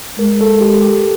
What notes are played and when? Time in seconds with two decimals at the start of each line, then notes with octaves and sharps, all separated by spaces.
0.19 G#3 A#4
0.41 A4
0.61 G4
0.82 G4